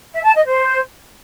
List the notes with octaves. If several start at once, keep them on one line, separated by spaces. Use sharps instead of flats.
E5
A5
D#5
C5